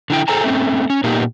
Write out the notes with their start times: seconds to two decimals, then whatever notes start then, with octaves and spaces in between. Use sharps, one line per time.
0.10 D3 E4 G5
0.28 G#4 A4 C5 G5 G#5 A#5
0.43 A3 C4 C#4
0.90 C#4
1.04 A#2 A#3 B3 D#4 G4